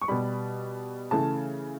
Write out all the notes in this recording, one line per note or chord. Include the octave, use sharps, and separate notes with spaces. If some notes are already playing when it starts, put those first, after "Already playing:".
C#6
B2 G3 B5
C#3 E3 A3 A5